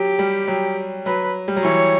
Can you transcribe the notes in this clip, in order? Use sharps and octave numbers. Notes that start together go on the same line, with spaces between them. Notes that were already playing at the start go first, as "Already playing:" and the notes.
Already playing: F#3 G4
G3
F#3
F#3 B4
G3
F#3
E3 C#5